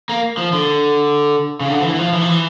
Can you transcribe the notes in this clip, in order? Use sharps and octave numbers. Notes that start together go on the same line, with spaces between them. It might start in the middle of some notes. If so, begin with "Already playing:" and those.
A#3
F3
D3
C#3
D3
F3
E3
E3
F3
E3
F3
E3